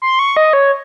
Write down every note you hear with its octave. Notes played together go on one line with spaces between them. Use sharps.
C6
C#6
D#5
C#5